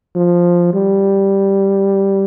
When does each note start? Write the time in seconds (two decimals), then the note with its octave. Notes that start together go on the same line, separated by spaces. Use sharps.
0.16 F3
0.74 G3